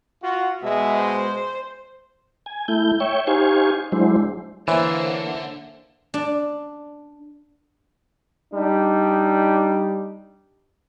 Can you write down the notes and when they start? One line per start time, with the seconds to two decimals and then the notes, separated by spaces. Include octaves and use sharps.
0.23 F4 F#4
0.63 B2 G#3 E5
0.98 C5
2.46 G#5
2.68 A3 E4 G6
3.00 C#5 E5 G5 C#6
3.27 D#4 G4 C5 F5 G#5 C#6
3.92 F#3 G#3 D4 E4 C5
4.68 D3 E3 A#3 C5 C#5 E5
6.14 D4
8.54 G3 D4 D#4